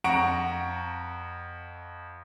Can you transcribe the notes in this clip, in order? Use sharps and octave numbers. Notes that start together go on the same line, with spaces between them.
F2 F#5 A#5 C#6 D7